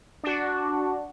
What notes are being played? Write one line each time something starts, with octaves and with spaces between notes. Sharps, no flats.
D4 F#4